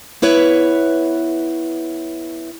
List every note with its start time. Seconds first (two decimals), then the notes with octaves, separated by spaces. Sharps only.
0.22 B3 E4 B4 C#5 E5